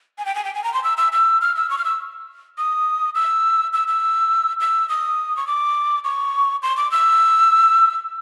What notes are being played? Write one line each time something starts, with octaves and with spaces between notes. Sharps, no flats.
G#5
G5
G#5
G5
G#5
A#5
C6
E6
E6
E6
F6
E6
C#6
F6
E6
D#6
E6
E6
E6
E6
D#6
C#6
D6
C#6
C6
D6
E6